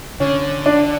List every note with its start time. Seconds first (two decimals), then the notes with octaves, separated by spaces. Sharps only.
0.20 D3 C#4
0.66 D4